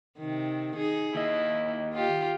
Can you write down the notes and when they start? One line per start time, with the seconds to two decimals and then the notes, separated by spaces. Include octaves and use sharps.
0.18 C3 D#3
0.76 D#4 G#4
1.15 D#2 E4 D#5
1.94 F4 G4